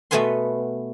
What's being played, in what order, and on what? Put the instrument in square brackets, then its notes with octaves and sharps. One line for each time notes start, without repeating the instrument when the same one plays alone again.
[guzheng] B2 A3 B3 B4 G#5 C6